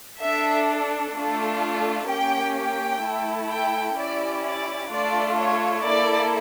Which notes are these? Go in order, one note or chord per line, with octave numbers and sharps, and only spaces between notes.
D4 A4 E5
A3 D4 F4 A4
A#3 C#4 G4 G5
G5
A3 E4 A4
G5
C#4 E4 G4 D5
D5
A3 D4 F4 A4 D5
C#5
A#3 E4 A4 D5